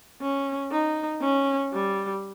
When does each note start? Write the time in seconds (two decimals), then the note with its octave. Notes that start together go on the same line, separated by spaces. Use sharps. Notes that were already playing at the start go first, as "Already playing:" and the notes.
0.21 C#4
0.71 D#4
1.22 C#4
1.73 G3